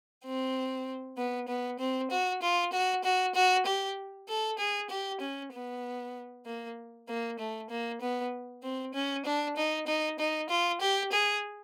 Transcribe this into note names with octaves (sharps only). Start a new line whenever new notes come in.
C4
B3
B3
C4
F#4
F4
F#4
F#4
F#4
G4
A4
G#4
G4
C#4
B3
A#3
A#3
A3
A#3
B3
C4
C#4
D4
D#4
D#4
D#4
F4
G4
G#4